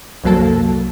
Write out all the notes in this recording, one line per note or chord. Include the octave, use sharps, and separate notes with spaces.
C2 F#2 F#3 A#3 A4 A5